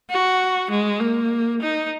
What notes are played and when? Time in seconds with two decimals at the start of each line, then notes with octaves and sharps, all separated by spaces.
0.10 F#4
0.71 G#3
1.00 A#3
1.61 D#4